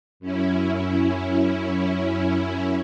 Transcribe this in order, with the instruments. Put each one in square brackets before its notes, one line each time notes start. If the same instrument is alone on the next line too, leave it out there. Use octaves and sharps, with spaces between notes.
[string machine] F#2 C#4 E4